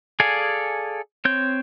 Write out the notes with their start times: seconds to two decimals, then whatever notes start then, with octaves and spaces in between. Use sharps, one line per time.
0.20 G#4 A4 D5 F5 G#5
1.25 C4 C#5 G6